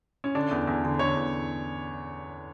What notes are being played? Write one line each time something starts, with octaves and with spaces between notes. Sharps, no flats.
C#4
D3 D4
E2
E2
D3
D3 C#5
E2